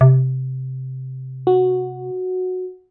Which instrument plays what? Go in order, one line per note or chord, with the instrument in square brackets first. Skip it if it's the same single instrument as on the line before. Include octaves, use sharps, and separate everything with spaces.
[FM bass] C3
[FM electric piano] F#4